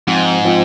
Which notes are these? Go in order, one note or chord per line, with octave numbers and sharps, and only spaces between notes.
G#2 F3 C4 F4
F3 C4 F4